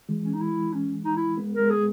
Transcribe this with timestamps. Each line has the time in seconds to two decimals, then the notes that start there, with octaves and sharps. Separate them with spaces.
0.09 E3 G#3
0.24 C#4
0.33 D#4
0.41 E4
0.73 C#4
1.05 D#4
1.17 E4
1.37 G#3 B3
1.54 A#4
1.59 G#3 B3
1.70 G#4